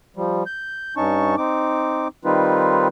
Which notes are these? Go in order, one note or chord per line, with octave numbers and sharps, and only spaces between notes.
F3 G3
G6
G2 C#4 D#4 A5 C#6
C4 D#4 D6
D#3 G3 C4 D#4 F4 B4